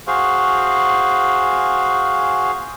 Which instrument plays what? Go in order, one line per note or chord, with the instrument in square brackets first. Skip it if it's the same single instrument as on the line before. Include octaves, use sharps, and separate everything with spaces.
[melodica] F#4 G#4 C5 F5